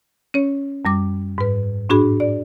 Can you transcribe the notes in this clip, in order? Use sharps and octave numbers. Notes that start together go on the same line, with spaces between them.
C#4 C#5
F#2 G3 D6
G#2 B4
A2 D4 F#4 G#4 B5
D5